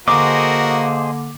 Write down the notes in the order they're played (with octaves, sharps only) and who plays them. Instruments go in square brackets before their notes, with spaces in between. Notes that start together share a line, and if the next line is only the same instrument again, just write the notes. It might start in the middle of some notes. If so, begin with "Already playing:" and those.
[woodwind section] D3 A#3 [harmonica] F#4 A#4 [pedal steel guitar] G#4 C5 D#5 [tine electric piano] D6